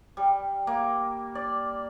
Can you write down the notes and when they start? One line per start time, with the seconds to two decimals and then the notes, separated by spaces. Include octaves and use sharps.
0.17 G3
0.67 A#3
1.35 D5